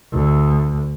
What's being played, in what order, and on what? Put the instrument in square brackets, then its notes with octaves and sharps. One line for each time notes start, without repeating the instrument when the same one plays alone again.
[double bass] D2